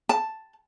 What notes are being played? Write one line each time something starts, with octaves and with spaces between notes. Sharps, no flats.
A5